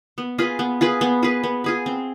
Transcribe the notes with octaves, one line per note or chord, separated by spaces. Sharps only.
B3
F4 G#4 B4
B3
F4 G#4 B4
B3
F4 G#4 B4
B3
F4 G#4 B4
C4